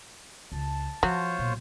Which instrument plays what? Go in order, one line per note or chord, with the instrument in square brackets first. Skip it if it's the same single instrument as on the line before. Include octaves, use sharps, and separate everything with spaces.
[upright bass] C#2 [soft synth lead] A5
[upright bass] F3 [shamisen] F#3 [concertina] F4 C5 C#5
[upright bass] B1 [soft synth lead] A#2